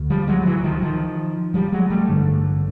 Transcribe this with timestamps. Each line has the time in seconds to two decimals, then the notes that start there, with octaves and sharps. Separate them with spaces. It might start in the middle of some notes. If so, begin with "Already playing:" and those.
Already playing: D2
0.10 F3 G3
0.28 F#3 G#3
0.42 G3
0.46 E3 F#3
0.64 D#3 F3
0.82 D#3 F3
1.54 F3 G3
1.72 F#3 G#3
1.90 G3 A3
2.08 A1 G2 D3